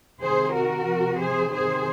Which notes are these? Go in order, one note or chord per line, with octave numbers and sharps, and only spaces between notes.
C3 D#3 G#4 C5
F#4 A#4
C3 F3
G#4 C5
C3 D#3 G#4 C5